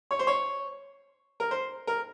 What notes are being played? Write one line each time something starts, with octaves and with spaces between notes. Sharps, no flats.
C#5
C5
C#5
A#4
C5
A#4